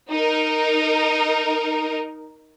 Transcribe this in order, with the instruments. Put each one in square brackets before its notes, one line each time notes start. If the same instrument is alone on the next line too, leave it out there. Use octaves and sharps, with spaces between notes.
[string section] D#4 A#4